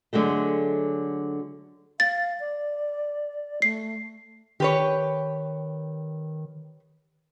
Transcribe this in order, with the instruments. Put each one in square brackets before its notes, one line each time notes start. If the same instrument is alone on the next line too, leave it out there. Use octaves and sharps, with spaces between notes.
[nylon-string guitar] D3 F#3 G#3 A3
[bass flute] F5 [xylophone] A6
[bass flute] D5
[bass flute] A3 [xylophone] C7
[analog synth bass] D#3 [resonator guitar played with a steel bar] G4 B4 C#5